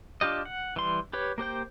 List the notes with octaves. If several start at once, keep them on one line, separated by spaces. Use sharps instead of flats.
D4 F4 G4 D#5
F#5
E3 G3 C6
G4 B4 C#5
A#3 G4 C5 G5